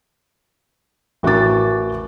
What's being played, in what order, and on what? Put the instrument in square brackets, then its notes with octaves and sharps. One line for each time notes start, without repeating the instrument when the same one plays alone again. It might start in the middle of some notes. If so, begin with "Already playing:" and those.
[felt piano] A1 F#4 A#4 D6 A6